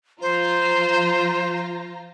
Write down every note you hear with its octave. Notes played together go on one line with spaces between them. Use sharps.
F3 F4 C5 A#5